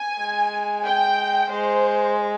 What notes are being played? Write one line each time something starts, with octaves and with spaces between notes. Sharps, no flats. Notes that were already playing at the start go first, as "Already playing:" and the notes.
Already playing: G#5
G#3
G5
G#3 C5